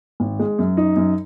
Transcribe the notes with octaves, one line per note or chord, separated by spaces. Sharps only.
G#1
G#3
F#2
D#4
F#2